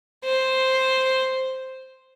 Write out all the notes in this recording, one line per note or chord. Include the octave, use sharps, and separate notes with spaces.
C5